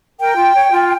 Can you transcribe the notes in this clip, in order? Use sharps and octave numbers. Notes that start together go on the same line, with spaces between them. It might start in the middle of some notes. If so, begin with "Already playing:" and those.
A#4 G5
F4
C#5
F4